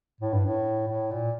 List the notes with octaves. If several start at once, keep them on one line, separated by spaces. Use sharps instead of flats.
A2
G2
A2
A2
A#2